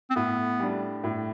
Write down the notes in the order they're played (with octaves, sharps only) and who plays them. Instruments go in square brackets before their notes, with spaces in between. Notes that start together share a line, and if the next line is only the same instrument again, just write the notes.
[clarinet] C4
[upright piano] A2 [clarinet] B3
[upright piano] G3 D4
A2